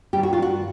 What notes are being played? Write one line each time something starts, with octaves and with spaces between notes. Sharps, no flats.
G2 D#3 G4
F#4
F4
F#4